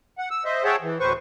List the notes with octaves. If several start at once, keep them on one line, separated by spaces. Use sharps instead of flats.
F#5
E6
C5 D#5 E5
G#4 C#5 E5 F#5 G5 A5
E3
D2 A2 B4 C5 C#6